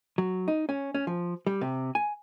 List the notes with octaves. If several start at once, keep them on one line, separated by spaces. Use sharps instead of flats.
F#3
D#4
C#4
C#4
F3
G3
C3
G#5